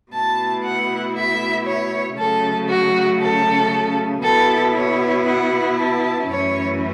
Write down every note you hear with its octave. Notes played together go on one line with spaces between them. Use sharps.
B2 A3 E4 A5
F#5
E5
C#5
C#3 F#3 A3 C#4 A4
F#4
A4
B2 B3 E4 A4
C#5
F#5
A5
F#2 E3 A3 C#4 E4 C#5